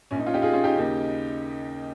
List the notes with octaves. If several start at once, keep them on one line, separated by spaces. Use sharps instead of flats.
A#1 A#2 C#4
D#4
C#4 F4
D#4 G4
F4 G#4
C#4 F4
D#4 G4
D#2 C#3